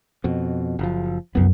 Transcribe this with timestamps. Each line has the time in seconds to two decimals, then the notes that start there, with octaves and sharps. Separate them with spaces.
0.24 F2 B2
0.79 F#1 F3
1.35 C2 F#2 B3